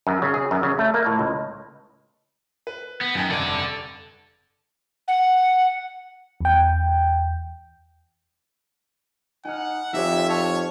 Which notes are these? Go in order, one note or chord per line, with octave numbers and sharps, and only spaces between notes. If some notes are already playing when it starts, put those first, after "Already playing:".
F#2
C#3
G#4
F#2
C#3
A3
A#3
A2
C#2
B4
B3
F#2 D#4 G5 G#5
F1 G2 A4 D5 G#6
F#5
E2 G5
D#4 F#5 G#5 F6
F2 D#4 G4 C#5 E5
C#5 A5 F6